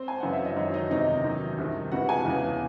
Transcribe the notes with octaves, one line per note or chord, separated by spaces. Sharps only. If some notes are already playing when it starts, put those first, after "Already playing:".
Already playing: C4 C5
G#5
F#2 C#3 E3 F#5
E5
D#5
F#2 D#3 C#4 C#5
D#4 D#5
E2 C3 D#3 D#4 D#5
F#2 D#3
C2 C3 D#3
C#2 C3 E3 F#4 F#5
G#4 G#5
E2 C#3 E3